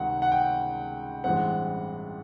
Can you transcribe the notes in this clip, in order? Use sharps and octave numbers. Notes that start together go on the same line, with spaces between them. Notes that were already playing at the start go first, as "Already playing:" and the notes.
Already playing: C#2 C3 D#3 G3 F#5
F#5
G5
A1 G2 E3 G#3 C4 F#5